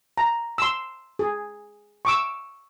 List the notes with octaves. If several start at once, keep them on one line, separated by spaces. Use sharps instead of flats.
A#5
C6 E6
G#4
C#6 D6 E6